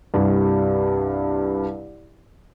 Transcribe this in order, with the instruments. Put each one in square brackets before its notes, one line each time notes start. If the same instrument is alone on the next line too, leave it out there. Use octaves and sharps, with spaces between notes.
[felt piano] C2 G2